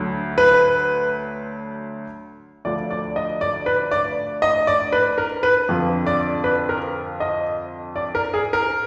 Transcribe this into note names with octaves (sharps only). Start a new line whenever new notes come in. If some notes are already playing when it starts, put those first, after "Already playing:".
Already playing: D2 D3 F#3
B4
D2 D3 F3 D5
D5
D#5
D5
B4
D5
D#5
D5
B4
A#4
B4
F2 D3 F3
D5
B4
A#4
D#5
D5
A#4
G#4
A#4